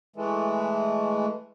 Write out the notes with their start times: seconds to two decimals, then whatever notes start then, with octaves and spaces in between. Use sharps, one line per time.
0.16 E3 G#3 A3